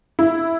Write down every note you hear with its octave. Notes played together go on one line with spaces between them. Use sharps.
E4